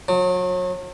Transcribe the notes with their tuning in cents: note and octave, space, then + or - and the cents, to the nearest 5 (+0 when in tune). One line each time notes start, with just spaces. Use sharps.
F#3 -35